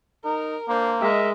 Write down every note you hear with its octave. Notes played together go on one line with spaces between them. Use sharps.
D#4 A#4
A#3 D4 C5
G#3 A#4 D#5 E5